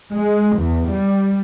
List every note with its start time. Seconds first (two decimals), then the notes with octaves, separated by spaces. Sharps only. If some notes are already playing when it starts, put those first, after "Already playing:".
0.12 G#3
0.58 E2
0.89 G3